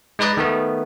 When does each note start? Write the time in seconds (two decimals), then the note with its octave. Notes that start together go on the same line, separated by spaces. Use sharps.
0.19 G#3 D#4 B4 D5 D#5
0.37 D#3 A3 B3